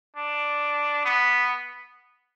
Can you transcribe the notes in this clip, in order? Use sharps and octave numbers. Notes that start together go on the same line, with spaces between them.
D4
B3